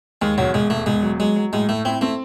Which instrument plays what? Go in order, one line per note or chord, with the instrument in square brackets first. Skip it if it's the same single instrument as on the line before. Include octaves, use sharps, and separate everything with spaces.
[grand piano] D#2 [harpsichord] G#3
[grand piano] E1 [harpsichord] F#3
[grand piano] E1 [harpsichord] G#3
[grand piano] E1 [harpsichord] A3
[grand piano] E1 [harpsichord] G#3
[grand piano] F#3
[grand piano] F#3 [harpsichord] G#3
[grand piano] F#3
[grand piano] A2 [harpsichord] G#3
[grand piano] A2 [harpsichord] A3
[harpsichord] C4 [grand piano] E4
[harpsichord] A3 [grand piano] C4